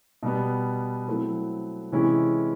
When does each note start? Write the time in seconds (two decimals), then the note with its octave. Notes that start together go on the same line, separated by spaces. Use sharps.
0.23 B2 G3 B3
1.08 F#3 A3 C4 E4 A4
1.92 C3 E3 G#3 C#4 E4